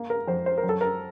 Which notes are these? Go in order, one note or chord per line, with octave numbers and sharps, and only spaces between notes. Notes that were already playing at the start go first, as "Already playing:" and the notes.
Already playing: A#3
A#4
F2 C5
C5
A#4
F#2
A4
A#4